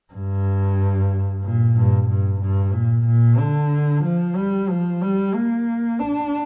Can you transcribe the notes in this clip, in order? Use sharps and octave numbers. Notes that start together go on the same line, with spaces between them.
G2
A#2
G2
G2
G2
A#2
A#2
D3
F3
G3
F3
G3
A#3
D4